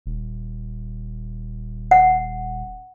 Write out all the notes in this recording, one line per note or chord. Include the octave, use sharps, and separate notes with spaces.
D#1
F#5